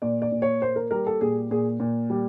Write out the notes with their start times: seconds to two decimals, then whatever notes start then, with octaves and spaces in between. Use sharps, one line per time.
0.02 A#2 D5
0.22 D5
0.32 A#2
0.42 C#5
0.62 A#3 C5
0.76 A#4
0.91 G3 A#4
1.07 A4
1.21 A#2 G#4
1.51 A#2 G#4
1.80 A#2
2.10 G3